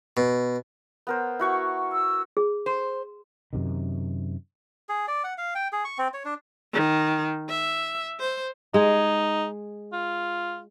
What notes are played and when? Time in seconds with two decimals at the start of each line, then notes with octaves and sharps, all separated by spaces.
0.17 B2
1.07 B3 A#4 C5
1.39 E4 F#4 C#6
1.92 E6
2.37 G#4
2.66 C5
3.53 F#2 C3 D#3
4.89 G#4
5.08 D5
5.24 F#5
5.38 F5
5.55 G5
5.72 G#4
5.85 C#6
5.98 C4
6.14 C#5
6.25 D4
6.73 D#3
7.49 E5
8.20 C5
8.74 G#3 D#4 G#4
9.93 F4